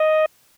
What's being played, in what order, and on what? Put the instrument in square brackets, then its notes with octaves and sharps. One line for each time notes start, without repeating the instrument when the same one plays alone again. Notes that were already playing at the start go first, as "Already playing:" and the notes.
Already playing: [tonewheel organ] D#5